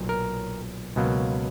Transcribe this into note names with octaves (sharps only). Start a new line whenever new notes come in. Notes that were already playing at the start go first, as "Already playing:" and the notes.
Already playing: B1 A#2 F#3
A#4
C#2 B2 F#3 A#3